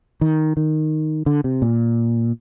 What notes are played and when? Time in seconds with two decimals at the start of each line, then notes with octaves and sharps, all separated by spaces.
0.21 D#3
0.57 D#3
1.26 D3
1.44 C3
1.62 A#2